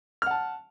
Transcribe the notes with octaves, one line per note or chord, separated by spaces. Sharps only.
F#5 A5 F6